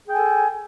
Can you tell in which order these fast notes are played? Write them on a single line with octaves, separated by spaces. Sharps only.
G#4 G5 G#5 A4